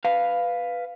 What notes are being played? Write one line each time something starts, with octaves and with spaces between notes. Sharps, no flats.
B4 F5